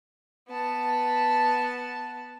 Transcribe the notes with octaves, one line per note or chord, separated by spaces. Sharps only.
B3 A5